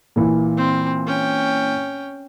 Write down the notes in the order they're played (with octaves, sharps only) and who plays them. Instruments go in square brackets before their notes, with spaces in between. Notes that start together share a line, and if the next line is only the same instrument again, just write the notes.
[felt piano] A#2 E3
[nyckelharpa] C4
C#4 G5